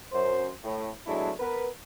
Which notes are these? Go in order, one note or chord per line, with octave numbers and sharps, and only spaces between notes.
F#2 C5
A2
B2 F#3 G#3 A3 D4 E4
B3 A#4 B4